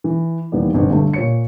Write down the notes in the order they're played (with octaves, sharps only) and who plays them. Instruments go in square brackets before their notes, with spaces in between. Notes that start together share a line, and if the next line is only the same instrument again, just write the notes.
[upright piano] E3
D#2 E3 G3 B3 D5
G1 C2 G#2
G2 D3 A3
A#2 C#5 C#7